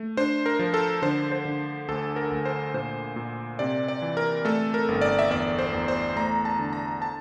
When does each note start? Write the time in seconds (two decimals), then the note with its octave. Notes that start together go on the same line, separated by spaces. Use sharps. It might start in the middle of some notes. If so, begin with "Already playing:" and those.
Already playing: A3
0.17 D4 C5
0.46 A#4
0.59 F3
0.74 A4
1.02 D3 C5
1.32 C5
1.45 D3
1.88 D2 A4
2.16 A#4
2.32 D2
2.45 C5
2.74 A#2 C5
3.16 A#2
3.59 C3 D5
3.88 D5
4.02 E3
4.17 A#4
4.45 A3 A4
4.74 A#4
4.88 G1
5.02 D5
5.19 E5
5.30 E2 D5
5.59 C5
5.73 E2
5.88 C5
6.16 A3 A#5
6.45 A5
6.59 D3
6.73 A#5
7.02 A5